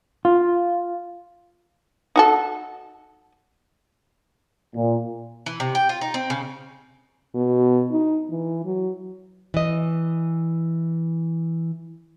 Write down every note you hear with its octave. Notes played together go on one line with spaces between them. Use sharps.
F4
D#4 F#4 A4
A#2
E3
C3
G5
F4
D#4
C4
C#3
B2
D#4
E3
F#3
E3 D#5